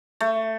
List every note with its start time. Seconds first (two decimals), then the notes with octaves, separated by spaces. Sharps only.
0.20 A3